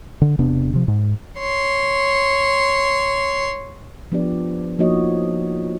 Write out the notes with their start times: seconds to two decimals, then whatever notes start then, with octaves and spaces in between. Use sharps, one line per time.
0.22 D3
0.38 E1 C3 B3 D4
0.73 C3 F3
0.88 G#2
1.39 C#5 C6
4.12 F3 B3 D4 G4 D5
4.79 F3 A#3 D#4 F#4 C#5 D#5